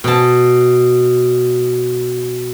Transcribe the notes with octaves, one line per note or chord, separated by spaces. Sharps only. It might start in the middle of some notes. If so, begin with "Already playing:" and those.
B2 A5